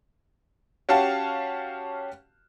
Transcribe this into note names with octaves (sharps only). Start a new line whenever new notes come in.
C#4 F#4 G4 F5 A5